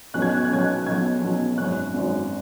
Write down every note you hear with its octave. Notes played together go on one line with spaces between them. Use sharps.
B1 B2 F#3 C#4 F#6
G#6
F#6
G#6
F#6
B1 B2 F#3 C#4 G#6
F#6
B1 B2 F#3 C#4 G#6
B1 B2 F#3 C#4
G#1 F#2 F#3 F#6
G#1 F#2 F#3